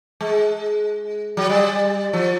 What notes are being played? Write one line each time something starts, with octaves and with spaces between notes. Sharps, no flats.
G#3
F#3
G3
F3